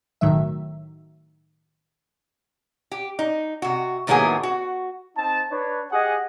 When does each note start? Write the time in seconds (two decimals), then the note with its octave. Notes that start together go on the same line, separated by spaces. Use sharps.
0.21 B1 A2 D#3 F#3 E5
2.91 G4
3.19 D#4
3.62 C3 F#4
4.07 A2 D#3 F#3 A#3 B3 G#4
4.43 F#4
5.16 C4 D#4 A5
5.51 D4 B4 C#5
5.92 G4 G#4 D#5 F#5 G#5